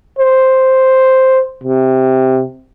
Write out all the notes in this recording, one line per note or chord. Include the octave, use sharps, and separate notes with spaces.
C5
C3